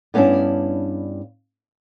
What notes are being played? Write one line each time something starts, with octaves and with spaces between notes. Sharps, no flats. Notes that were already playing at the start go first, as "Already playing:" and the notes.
G2 B3 C#4 D4 E4